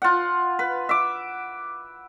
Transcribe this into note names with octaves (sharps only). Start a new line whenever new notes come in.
F4 F#5
B4
E5 D6